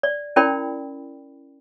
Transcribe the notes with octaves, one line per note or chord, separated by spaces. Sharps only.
D5
C#4 E4 A#4 D5 G5 B5